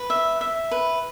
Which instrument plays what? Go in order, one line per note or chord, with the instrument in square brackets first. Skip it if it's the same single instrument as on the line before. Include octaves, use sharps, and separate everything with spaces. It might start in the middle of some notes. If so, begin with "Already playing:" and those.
Already playing: [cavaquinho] B4
E5
E5
B4